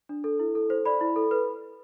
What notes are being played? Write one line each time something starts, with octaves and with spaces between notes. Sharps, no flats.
D4
A4
E4
A4
C5
D5 B5
E4
A4
B4